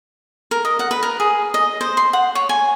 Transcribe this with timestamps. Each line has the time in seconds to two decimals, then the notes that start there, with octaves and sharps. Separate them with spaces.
0.51 A#4
0.65 D#5
0.79 F#5
0.91 B4
1.03 A#4
1.20 G#4
1.54 D#5
1.81 C5
1.97 C6
2.13 F#5
2.35 C#5
2.49 G#5